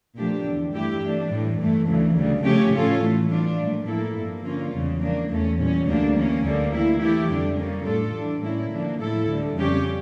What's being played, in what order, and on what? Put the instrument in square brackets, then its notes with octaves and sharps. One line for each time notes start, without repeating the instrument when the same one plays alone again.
[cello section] A#2 F3 A3 D4 G4
E2 D3 F3
G2 E3 A3 E4 G4
E3 A3 D4
A2 E3 G3
G2 E3 A3
D2 C#3 E3
D2 C#3 G3
C#3 F3 A3 C#4 G4
A2 F3 C#4 F4 A4
A2 E3 A3
E3 G3 D4 F4
A#2 F3 A3
A2 F3 A#3 E4 A4
G2 F3 A#3
D3 F3 A#3 C#4 F4
E2 C#3 G3
C#3 F3 A#3 D4
E2 E3 A3 C#4
A#2 G3 C#4
D2 D3 G3 A#3 D4
E3 A#3 C#4
D2 D3 G3 A#3
E3 A#3 E4
E3 A3 E4 G4
F2 D3 G3 D4
C#3 G3 A#3 C#4
A2 G3 D4 F4 A4
E3 G3 D4
A2 G3 A#3 C#4 E4
D3 F3 A#3 D4
A2 F3 A3 E4 A4
D2 D3 G3
F2 C#3 G3 C#4 G4